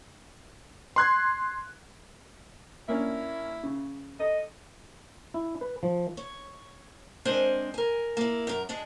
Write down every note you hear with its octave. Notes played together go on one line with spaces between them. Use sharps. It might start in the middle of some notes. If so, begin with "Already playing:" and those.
C6 F#6 G#6
A#3 C#4 D4 E4
C#3
A4 D#5
E4
B4
F3
C#5
G#3 C4 D4 A#4 C5 G#5
A#4 G#5
A#3 E4
F#2 A#4
G#3 D4 G#4